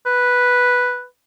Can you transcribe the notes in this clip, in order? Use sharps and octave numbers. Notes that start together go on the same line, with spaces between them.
B4